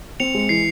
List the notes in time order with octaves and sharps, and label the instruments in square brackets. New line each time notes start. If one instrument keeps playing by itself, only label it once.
[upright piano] C4 [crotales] C#7 F7
[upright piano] G#3 [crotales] C#7
[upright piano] E3 [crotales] C7